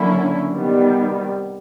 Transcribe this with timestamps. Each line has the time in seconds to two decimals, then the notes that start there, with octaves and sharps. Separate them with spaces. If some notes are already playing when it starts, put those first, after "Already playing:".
Already playing: D3 F#3 A#3 C#4 E4
0.52 C3 D#3 G3 B3